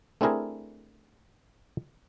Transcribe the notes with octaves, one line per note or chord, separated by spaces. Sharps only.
A3 C4 D4 E4 G#4 A#4